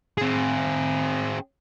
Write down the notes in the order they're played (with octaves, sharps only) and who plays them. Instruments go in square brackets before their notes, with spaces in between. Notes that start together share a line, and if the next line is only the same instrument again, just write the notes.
[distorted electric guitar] C4 G#4